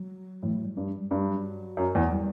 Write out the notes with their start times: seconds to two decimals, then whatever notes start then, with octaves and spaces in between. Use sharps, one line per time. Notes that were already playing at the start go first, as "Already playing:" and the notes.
Already playing: F#3
0.42 A2 E3
0.54 F#3
0.65 G3
0.77 G2 F#3
0.88 F#3
1.00 G3
1.11 G2 G3
1.27 F#3
1.77 F#2
1.95 E2
2.12 G3